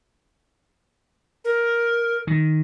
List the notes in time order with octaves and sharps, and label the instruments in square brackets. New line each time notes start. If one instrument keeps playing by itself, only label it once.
[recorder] A#4
[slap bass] D#3